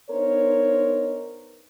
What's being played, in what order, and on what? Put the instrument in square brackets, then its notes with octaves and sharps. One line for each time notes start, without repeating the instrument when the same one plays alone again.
[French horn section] B3 D4 D#4 A#4 C5 C#5